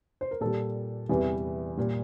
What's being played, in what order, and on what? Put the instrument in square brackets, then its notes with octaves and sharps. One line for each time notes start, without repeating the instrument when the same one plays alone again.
[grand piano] C5
A#4
A#2 G3 A4
E2 C3 E3 G3
A#2 G3